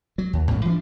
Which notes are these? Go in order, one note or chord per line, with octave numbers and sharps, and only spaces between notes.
F#3
D#2
A1 G#2 C#3
E3 F3 D4